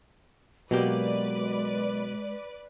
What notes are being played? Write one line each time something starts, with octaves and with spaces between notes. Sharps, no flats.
B2 F#3 G#3 A#3 G4 B4 D5